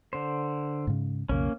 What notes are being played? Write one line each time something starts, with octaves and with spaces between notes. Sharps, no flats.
D3 C5
G#2 C#3
B1 F2 C#3 A#3 C#4